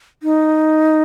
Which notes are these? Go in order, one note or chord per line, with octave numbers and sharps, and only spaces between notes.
D#4